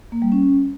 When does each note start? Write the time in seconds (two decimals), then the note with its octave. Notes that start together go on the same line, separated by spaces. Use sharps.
0.12 A#3
0.22 G3
0.32 C#4